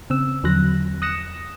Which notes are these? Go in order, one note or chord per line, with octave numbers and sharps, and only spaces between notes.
C#3 C4 E6
E2 D3 F3 F#3 F#6 A#6
D#6 F#6 A#6 C#7 E7